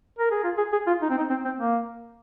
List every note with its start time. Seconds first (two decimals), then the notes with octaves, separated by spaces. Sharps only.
0.19 A#4
0.31 G#4
0.44 F4
0.58 G#4
0.72 G#4
0.87 F4
1.02 D#4
1.10 C4
1.18 D#4
1.30 C4
1.45 C4
1.59 A#3